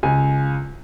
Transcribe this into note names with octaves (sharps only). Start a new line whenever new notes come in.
C#2 G#5